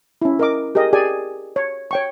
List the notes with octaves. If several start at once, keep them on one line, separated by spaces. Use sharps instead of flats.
C#4 E4
A#4 D#5 D6
G4 G#4 A#4 D#5
G4 G#4 D5 G#5
C#5
C#5 G5 C#6